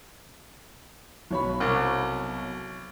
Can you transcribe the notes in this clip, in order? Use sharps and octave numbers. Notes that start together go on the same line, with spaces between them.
B1 C#5 B5
C2